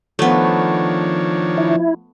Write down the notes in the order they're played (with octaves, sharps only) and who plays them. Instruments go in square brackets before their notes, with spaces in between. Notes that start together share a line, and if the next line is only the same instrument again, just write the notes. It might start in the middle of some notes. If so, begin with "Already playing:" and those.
[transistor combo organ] D#3 D4 C#5 [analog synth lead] F3 [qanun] A3 B3
[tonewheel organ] E4